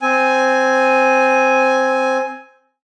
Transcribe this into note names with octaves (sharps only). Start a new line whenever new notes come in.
C4 G#5